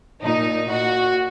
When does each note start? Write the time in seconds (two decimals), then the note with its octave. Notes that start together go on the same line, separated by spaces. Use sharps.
0.22 A#2 D#4
0.68 A#2 F#4